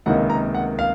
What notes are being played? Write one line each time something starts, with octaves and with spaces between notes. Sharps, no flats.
C#2 C3 D#3 A#3 D#4 F#5
A#5
F#5
F5